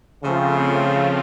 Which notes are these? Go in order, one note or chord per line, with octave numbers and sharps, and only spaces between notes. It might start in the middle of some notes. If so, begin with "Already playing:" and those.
C#3 F3 A3 C4 F4